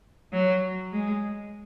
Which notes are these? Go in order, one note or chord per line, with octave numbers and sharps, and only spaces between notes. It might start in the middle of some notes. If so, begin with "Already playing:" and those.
F#3
G#3